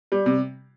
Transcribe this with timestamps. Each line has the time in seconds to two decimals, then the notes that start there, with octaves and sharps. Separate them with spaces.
0.12 G3
0.26 C3